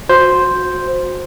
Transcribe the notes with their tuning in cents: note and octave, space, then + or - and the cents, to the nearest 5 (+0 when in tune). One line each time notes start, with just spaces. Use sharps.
F#4 -25 C5 +0